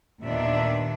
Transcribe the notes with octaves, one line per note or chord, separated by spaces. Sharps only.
D#2 A#2 D#3 B3 D4 E5